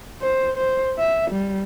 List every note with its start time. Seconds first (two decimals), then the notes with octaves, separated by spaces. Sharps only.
0.22 C5
0.57 C5
0.99 E5
1.31 G3